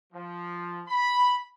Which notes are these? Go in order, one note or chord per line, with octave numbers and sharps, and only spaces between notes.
F3
B5